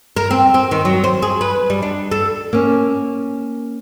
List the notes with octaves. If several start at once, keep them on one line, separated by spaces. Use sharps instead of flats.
A#4
C4
C4
D#3
F#3
C5
G#4
B4
G3
D4
A4
A#3 C#4